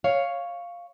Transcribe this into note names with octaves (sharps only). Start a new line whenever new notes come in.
C#5 F5